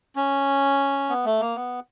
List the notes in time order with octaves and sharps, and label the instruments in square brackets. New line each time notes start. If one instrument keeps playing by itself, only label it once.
[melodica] C#4
B3
A3
A#3
B3